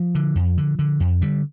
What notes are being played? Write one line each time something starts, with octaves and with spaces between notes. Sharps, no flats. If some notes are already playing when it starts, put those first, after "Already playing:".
Already playing: F3
D3
F2
D3
D3
F2
D3 G3